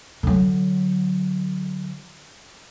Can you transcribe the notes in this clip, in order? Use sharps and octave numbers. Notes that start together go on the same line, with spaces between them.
D3 F#3